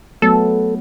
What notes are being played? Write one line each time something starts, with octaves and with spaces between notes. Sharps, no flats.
F#3 A3 B3 A4